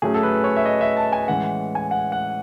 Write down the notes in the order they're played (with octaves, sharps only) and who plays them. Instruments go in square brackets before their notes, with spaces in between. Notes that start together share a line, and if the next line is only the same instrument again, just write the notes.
[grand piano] A2 F#3 A3 C#4 G#4
A4
B4
C#5
E5
D#5
E5
A5
G#5
A2 E3 G#3 C#4 F#5
G#5
F#5
F#5